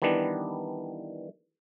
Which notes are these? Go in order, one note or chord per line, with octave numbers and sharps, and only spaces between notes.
D#3 E3 G3 B3 D4